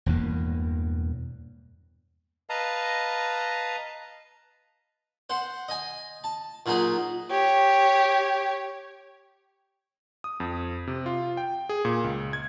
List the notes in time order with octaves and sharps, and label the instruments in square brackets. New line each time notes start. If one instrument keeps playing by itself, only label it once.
[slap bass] E1 E2 G2 A#3
[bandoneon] B4 D#5 F5 A5 A#5
[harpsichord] C5 F#5
D#5 G#5
A5
A#2 F#3 D#4 G#4
[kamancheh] G4 C#5
[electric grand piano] D#6
F2
C3
F4
G5
G#4
A#2
C#2
G#6